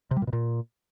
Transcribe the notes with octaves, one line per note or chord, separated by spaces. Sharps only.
C3
G3
A#2
B2
A#2